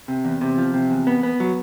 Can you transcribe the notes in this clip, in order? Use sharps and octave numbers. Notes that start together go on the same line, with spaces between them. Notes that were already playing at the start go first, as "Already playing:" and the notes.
C3
E2
C3
F3
C3
E2
B3
B3
F#3